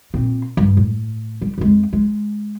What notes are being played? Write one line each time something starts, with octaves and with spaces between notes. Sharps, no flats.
A#2 C4
G2
A2
G3
F2 G#3
G#3